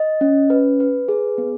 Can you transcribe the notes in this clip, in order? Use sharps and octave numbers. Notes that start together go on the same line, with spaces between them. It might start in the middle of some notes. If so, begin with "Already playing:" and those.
Already playing: D#5
C#4
B4
B4
G#4
B3